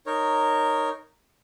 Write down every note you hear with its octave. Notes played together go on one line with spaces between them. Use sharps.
D#4 A#4 C#5